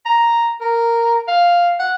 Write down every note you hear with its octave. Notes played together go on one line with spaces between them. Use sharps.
A#5
A#4
F5
F#5